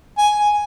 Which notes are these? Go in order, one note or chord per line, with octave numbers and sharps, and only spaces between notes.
G#5